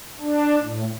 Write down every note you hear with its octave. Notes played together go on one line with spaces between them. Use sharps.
D4
A2